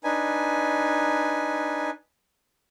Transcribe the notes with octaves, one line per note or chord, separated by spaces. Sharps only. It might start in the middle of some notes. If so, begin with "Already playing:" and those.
D4 D#4 B4 G#5